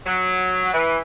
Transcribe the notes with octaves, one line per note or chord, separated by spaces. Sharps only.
F#3
E3